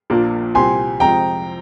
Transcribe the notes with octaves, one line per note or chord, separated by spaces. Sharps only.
A#1 A#2 F3 A#3 D4
C2 A#2 G3 C4 G4 G#5 C6
F2 C3 F3 G#3 G5 A#5